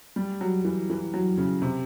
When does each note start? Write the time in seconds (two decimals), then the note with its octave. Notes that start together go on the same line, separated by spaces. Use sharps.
0.16 G3
0.41 F#3
0.65 E3
0.90 E3
1.14 F#3
1.37 C#3
1.62 C3